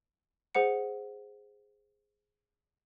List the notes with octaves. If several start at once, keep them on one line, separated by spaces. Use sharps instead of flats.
G#4 C5 F#5 C#7